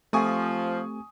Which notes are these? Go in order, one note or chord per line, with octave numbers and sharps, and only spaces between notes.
F3 A3 C4 G4 G#5 C#6 D#6